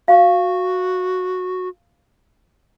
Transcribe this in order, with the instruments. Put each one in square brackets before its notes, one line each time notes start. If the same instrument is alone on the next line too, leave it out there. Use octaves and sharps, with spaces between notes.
[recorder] F#4 [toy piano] F5